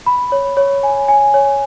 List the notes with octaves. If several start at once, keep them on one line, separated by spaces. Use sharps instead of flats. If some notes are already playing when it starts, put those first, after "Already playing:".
B5
C#5
C#5
G#5
G#5
C#5